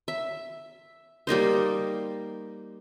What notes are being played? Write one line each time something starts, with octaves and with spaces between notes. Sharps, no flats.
E5
G3 A#3 D#4 C5